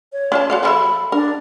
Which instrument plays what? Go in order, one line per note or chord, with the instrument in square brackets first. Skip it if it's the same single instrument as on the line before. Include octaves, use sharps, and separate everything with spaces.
[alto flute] C#5
[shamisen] C#4 F4 A5
[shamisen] F#4 A4 F5 [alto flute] C6
[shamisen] F3 A4 E5 [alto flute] B5
[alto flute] D4 [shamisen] A#4